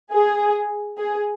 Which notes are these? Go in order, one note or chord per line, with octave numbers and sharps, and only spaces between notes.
G#4
G#4